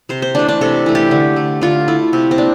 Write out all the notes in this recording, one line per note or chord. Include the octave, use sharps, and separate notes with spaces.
C3 C5
C5
E3 A3 D4
D4
C3 A4
E3 A3
G4
D3
A3
D3 F4
A3 E4
C3 C4
C4
A#3 D4